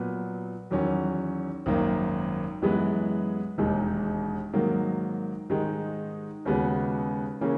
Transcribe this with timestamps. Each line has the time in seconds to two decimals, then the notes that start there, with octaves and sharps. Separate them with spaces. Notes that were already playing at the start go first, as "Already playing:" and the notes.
Already playing: A#2 F#3 B3
0.71 E2 D#3 F#3 C#4
1.66 G#1 F#2 D#3 A#3
2.62 F#2 E3 G#3 B3
3.58 E1 D#2 D#3 G#3 D#4
4.53 G#2 D#3 F#3 A#3
5.49 G#2 D#3 G#3 D#4
6.45 D#2 C#3 G#3 B3 F#4
7.41 C#3 E3 A#3 C#4